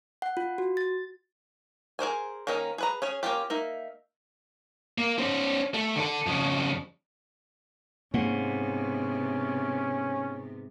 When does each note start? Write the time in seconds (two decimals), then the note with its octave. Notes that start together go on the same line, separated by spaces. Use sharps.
0.22 F#5
0.37 F4
0.58 F#4
0.77 A6
1.99 G#4 A#4 C5 G#5
2.47 D#3 A#3 C#4 D#4 A#4
2.78 G#4 B4 A#5
3.02 C#4 G#4 C#5
3.23 A#3 C#4 F4 G4
3.50 A#3 D#4 E5
4.98 A#3
5.18 C#4 C5
5.74 A3
5.96 D3 A4
6.26 F2 C#3
8.14 G#2 C3 A#3 B3 C#4 F#5